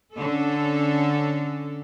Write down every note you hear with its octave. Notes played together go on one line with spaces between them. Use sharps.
D3 C#4 A4